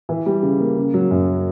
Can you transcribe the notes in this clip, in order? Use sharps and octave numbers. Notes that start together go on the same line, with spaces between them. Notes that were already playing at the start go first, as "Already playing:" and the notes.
E3
G3
C#3
A#3
C#3
F#3
F#2